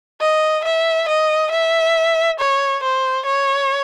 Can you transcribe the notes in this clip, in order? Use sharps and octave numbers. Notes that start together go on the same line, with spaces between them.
D#5
E5
D#5
E5
C#5
C5
C#5